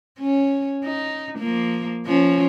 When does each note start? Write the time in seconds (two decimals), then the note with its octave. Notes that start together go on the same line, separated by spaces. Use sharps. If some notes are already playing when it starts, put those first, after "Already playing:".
0.20 C#4
0.84 D#4
1.39 F3 A#3
2.06 F3 C#4